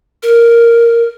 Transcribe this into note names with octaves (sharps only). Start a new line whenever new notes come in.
A#4